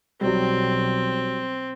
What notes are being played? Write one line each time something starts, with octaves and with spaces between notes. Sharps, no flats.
B1 F#3 G3 C4